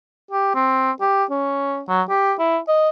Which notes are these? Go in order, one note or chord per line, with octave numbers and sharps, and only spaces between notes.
G4
C4
G4
C#4
F#3
G4
E4
D#5